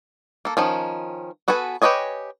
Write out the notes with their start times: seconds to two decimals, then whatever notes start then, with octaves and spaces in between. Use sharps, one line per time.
0.45 A#3 A4
0.57 D#3 F3 C#4
1.48 B3 F#4 A4 B4 G#5
1.82 G4 B4 C#5 D#5 G#5